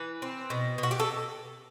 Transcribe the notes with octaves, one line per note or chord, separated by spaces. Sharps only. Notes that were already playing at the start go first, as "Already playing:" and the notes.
Already playing: E3 B4
C4
B2
B2
F#4
G4
A4